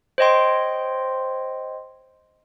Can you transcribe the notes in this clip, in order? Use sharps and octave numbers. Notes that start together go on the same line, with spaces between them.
C5 C#5 D#5 G5 C6